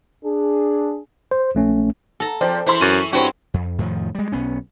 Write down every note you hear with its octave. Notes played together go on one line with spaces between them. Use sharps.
D4 G#4
C5
A#1 A3 C#4
A4 A#5
F3 C5 D5 G5
E3 E4 C5 C6
F#2 C#6 D#7
G2 C4 C#4 E4 F#4
F2
F2 A2 D#3 F3
G3 G#3
B1 B3 C#4